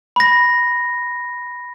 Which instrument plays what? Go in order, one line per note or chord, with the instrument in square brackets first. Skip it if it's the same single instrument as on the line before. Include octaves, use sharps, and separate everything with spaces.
[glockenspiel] B5 A#6